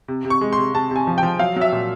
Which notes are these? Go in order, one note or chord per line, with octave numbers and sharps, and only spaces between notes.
C3
C3
C#6
G#3
C6
C3
C3 A5
C3 G#5
F3
G5
F3
F#3 F5
F#3 E5
A#2